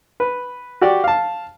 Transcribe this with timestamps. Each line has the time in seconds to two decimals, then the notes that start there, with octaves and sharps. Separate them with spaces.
0.20 B4
0.81 F#4 G4 D5
1.04 F5 A5